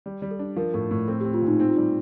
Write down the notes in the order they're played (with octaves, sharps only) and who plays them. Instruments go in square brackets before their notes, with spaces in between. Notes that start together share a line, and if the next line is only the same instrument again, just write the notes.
[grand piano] G3
G3
[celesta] A4
[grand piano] D4
[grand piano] F3 [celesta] A#4
[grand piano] A2 [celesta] A4
[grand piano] A2
[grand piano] C4 [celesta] A4
[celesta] G4
[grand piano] C4
[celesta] F4
[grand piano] A#2
[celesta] D#4
[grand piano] C4 [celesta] D#4
[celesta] F4
[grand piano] G3 [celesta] D#4